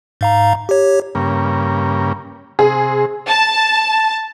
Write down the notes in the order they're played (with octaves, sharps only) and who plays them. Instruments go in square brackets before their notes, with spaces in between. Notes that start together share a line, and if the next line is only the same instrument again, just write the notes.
[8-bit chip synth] G#2 F5 A#5
G4 C#5
[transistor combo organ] G2 C#3 A#3
[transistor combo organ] C3 [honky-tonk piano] G#4
[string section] A5